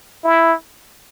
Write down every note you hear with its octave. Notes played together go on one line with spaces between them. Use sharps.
E4